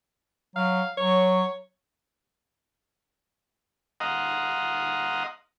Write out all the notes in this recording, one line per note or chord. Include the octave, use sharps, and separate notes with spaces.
F#3 F5
F#3 C#5
D#5 F5 F#5 A#5 C6 D#6